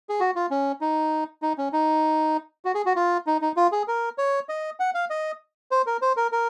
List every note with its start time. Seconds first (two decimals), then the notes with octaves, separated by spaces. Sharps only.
0.09 G#4
0.20 F#4
0.36 F4
0.51 C#4
0.81 D#4
1.42 D#4
1.58 C#4
1.73 D#4
2.65 F#4
2.75 G#4
2.86 F#4
2.96 F4
3.27 D#4
3.41 D#4
3.57 F4
3.72 G#4
3.88 A#4
4.18 C#5
4.49 D#5
4.80 F#5
4.94 F5
5.10 D#5
5.71 C5
5.87 A#4
6.02 C5
6.17 A#4
6.32 A#4